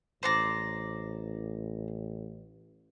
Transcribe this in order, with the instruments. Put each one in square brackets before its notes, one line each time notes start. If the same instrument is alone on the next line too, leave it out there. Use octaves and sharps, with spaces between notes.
[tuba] A1 [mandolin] C5 D5 A#5